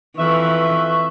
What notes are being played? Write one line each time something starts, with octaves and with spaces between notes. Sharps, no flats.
F2 E3 B4 E5 C#6